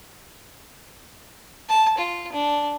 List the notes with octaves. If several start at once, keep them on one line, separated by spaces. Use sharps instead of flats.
A5
F4
D4